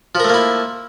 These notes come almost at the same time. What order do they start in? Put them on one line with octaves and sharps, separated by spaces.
F3 A#4 A3 A#3 E4